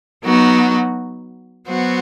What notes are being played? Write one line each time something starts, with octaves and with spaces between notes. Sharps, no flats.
F#3 B3 D#4 F#4
F#3 B3 F#4 C5